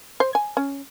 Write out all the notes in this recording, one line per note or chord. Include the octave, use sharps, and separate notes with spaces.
C5
G#5
C#4